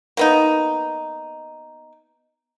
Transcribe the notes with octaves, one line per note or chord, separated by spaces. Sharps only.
A#3 B3 D#4